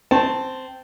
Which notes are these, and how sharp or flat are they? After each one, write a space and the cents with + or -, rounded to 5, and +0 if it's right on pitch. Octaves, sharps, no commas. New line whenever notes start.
C4 -10 A5 +0 C#6 -30